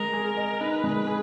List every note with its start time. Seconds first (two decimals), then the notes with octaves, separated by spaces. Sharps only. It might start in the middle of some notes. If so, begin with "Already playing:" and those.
Already playing: G#3 A#4
0.13 G#4
0.37 D#5
0.60 D#4 B4
0.84 G#3
1.07 G#4